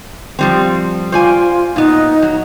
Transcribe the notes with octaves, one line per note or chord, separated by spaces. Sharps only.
F3 G3 C4
F4 C5 D5 G#5
A#2 B3 D#4
F#3